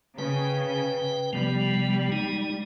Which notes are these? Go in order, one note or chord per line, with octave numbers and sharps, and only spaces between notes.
C#3 B4 G5
C3 F3 G3 B3
G#3 D#4